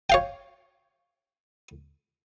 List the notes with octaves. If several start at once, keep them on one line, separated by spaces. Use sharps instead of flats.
C#5 F5 G5